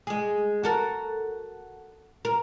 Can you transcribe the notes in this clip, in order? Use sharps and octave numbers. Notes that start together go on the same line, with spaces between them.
G#3 G#4
F#4 A4 A#4
A#4